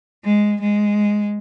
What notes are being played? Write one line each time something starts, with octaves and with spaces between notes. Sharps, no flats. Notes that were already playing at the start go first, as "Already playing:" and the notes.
G#3
G#3